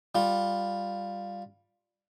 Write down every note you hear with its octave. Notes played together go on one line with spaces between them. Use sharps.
G3 F4